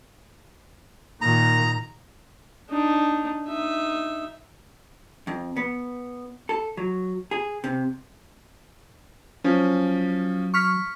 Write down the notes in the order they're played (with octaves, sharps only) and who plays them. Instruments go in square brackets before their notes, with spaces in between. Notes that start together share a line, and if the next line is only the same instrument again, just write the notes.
[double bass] A#2 D#3 [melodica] A#5
[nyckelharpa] D4 D#4
D#4 E5
[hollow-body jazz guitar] F2
B3
A4
F#3
G#4
C3
[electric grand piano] F3 C#4 [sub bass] F#3
[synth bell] C#6 F6 B6